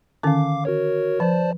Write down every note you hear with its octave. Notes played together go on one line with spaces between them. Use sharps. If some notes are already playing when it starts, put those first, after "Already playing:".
D3 D#3 C#4 F5 D6
F#4 A#4 C#5
F3 C5 D5 A5